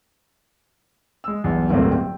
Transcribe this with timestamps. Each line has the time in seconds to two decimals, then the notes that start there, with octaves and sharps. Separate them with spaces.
1.24 G#3 E6
1.44 B1 E2 G2 E3
1.69 D1 G1 G2 A3 A#3 C4
1.92 G5